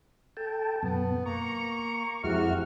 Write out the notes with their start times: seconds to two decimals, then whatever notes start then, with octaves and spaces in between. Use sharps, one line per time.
0.37 A4 G5 A5
0.83 F#2 B2 B3
1.26 A#3 A#5 C#6
2.24 F2 C3 G#3 E4 F#4 F6